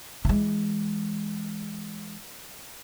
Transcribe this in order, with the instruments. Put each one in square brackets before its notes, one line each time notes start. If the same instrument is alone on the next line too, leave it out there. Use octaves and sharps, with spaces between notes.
[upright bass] E3 G#3